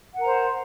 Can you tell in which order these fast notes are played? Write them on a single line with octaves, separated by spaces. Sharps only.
F#5 A#4 A#5 C5